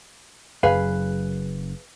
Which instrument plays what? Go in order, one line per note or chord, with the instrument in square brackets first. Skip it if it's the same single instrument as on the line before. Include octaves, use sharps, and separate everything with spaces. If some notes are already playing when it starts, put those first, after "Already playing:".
[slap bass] F#1 F#2 [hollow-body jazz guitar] G#4 B4 F5